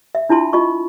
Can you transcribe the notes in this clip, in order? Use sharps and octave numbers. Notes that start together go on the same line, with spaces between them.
E5
D4 E4 F4 A5 C6
F4 D#5 C#6